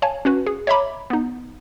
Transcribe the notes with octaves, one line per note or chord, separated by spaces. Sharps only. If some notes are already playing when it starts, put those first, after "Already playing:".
C#5 F5 G#5 A5
C#4 F#4 B4
G#4
C#5 D#5 E5 A#5 B5 D6
B3 D#4